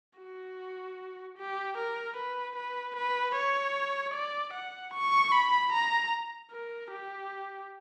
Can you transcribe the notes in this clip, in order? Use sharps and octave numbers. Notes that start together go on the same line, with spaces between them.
F#4
G4
A#4
B4
B4
B4
C#5
D5
F#5
C#6
B5
A#5
A#4
G4